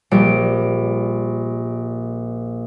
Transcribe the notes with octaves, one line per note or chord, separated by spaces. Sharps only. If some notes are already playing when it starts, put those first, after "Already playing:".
A#1 G3 D7